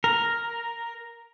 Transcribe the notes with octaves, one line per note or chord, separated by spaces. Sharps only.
A#4